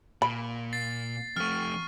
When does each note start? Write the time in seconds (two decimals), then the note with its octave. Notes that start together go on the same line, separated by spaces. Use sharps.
0.22 A#2 B5
0.73 A6 C7
1.36 F2 A3 C#6 F6